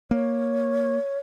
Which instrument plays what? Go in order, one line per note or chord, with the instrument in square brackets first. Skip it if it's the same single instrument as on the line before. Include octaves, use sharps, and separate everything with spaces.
[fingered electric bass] A#3 [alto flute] C#5